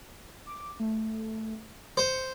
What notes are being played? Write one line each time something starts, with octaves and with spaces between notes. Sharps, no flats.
D6
A3
C5 C#7